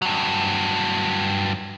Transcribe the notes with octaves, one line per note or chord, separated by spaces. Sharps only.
G2 F#3